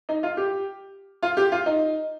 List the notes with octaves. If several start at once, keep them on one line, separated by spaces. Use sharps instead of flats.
D#4
F4
G4
F4
G4
F4
D#4